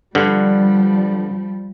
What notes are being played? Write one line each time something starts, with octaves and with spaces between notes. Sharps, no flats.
G2 D3 F3 G3